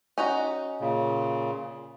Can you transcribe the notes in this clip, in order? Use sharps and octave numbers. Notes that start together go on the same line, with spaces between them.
C#4 D#4 F#4
A#2 C#3